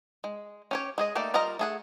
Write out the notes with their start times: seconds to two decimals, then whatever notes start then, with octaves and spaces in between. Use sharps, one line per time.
0.24 G#3
0.71 C#4 G4 C#5
0.98 G#3 G#4 D#5
1.15 A3 A#3 D#4 G4 D5
1.34 G3 F4 A#4 D#5 A#5
1.59 A3 G#4 F#5